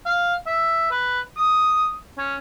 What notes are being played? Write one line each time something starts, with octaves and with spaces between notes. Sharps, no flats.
F5
E5
B4
D#6
C#4